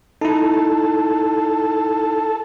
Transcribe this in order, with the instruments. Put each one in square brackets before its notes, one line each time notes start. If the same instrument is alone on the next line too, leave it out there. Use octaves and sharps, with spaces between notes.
[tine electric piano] D#4 E4 [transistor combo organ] A4